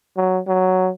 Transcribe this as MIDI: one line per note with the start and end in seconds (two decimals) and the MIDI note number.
0.17 0.40 54
0.47 0.90 54